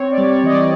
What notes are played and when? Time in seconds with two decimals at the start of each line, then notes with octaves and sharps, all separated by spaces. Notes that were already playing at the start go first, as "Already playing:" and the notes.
Already playing: C4 C#5
0.12 D5
0.18 G3
0.30 C#5
0.44 E3 D#5
0.50 D5